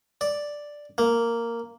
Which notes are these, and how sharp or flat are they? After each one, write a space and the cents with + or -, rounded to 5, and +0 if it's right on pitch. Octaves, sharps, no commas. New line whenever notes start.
D5 +0
A#3 -5